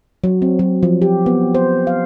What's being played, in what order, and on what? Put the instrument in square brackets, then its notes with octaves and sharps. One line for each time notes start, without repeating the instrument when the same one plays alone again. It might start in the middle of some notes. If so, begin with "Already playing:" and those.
[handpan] F#3
C4
F#3
F3
G4
B3
C5
F5